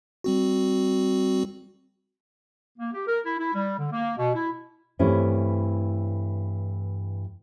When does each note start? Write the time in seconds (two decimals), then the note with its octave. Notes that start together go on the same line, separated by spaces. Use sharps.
0.24 G3 C4 F#4
2.78 A#3
2.93 G4
3.07 A#4
3.24 E4
3.39 E4
3.54 G3
3.78 D3
3.91 A#3
4.17 B2
4.34 E4
4.99 G2 E3 A3 C4 C#4 E4